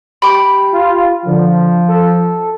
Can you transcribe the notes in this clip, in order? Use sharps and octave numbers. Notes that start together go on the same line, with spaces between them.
G4 B5 D6
F4
D3 F3
A4